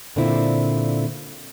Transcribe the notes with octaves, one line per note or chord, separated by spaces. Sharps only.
A#2 D3 C4 E4 F4